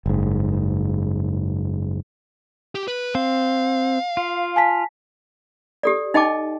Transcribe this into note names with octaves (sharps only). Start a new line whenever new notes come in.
F#1 G#2
G4
B4
C4 F5
F4
G#5 A5 B6
G4 A4 D5
D#4 D#5 G5 A5 D6